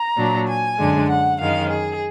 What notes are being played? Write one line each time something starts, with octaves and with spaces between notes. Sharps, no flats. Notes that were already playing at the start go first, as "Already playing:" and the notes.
Already playing: A#5
A#2 F#3 D4
G#5
F#2 D3 G#3 D4
F#5
F#2 D#3 G#3 F5
G#4